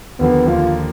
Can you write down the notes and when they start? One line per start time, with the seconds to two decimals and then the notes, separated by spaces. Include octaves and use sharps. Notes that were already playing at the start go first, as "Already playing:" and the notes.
0.19 D#2 D3 F3 A#3 B3
0.47 D#2 D3 F3 A#3 F4